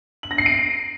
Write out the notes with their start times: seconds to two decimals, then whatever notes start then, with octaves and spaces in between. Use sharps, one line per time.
0.23 F#7
0.31 A#6
0.38 C7
0.46 D7